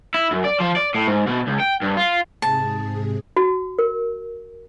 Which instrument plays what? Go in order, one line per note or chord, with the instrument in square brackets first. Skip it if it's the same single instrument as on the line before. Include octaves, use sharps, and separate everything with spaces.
[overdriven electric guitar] E4
F#2
D5
F3
D5
A2
G#2
B2
C#2
G5
G2
F4
[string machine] G#2 C3 G#4 [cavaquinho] A5
[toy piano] F#4
A#4